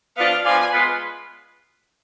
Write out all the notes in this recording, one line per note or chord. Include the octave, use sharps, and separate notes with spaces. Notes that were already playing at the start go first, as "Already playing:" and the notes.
F3 B3 D4 F4 F5
F3 B3 D4 F4 G#5
G#3 B3 F4 B4